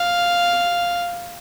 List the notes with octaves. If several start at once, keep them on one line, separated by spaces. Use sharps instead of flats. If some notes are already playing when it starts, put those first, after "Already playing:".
Already playing: F5